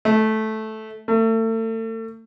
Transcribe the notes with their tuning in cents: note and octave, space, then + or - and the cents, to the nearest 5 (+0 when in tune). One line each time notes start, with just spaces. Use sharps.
A3 -10
A3 +35